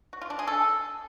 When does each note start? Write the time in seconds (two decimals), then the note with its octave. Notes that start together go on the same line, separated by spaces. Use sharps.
0.13 F#4
0.22 F4
0.30 D4
0.39 G#4
0.47 A4